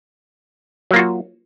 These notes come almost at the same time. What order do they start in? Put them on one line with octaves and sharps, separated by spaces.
F#3 A#3 F4 F#4